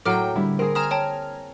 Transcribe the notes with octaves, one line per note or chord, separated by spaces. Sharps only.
A2 F#3 A#3 A4 G5 D6 F6 D7
D3 G3 E4
C4 G#4 A#4
C4 G#5 A#5 D#6 F6 E7
C#5 G5 A5